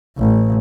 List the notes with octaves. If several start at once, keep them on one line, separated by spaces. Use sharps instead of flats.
A1